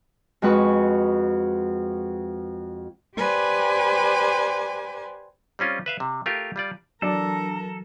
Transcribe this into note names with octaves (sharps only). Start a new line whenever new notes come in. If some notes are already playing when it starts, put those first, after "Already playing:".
F2 G#3 F#4 B4 C#6
G4 B4 C5 D5 G#5
G3 C4 C#4 F4
B4 E5 F5
C3
A3 F4 G4 A#4
G3 F4 D5
E3 F#3 D4 A4 A#4 D5 A5